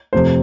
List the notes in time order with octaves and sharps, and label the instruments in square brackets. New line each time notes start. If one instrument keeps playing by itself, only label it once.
[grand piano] F2 C3 A3 C5